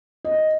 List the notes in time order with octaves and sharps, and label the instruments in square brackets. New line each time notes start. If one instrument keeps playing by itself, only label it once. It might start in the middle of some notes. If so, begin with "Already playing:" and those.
[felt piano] D#5